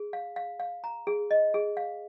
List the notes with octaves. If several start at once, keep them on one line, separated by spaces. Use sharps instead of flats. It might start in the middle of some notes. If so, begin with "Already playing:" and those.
Already playing: G#4
F5
F5
F5
A#5
G#4
D#5
G#4
F5